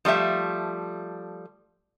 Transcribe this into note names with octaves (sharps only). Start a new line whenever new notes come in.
F3 G3 A3 E5